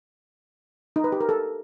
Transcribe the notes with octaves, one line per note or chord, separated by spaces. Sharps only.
D#4
B4
G4
A#4
A4